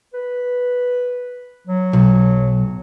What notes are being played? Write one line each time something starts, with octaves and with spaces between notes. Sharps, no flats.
B4
F#3
B1